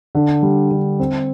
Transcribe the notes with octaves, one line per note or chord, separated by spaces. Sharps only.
D3
G3
D3
C4